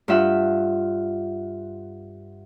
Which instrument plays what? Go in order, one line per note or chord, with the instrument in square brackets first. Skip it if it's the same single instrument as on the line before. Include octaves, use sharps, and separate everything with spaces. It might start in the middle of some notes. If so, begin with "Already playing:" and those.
[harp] G2 F4 E5 F#5